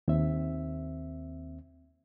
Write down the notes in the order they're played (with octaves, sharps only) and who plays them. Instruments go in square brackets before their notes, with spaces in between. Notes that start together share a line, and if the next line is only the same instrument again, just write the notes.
[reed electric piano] D#2 C4 E5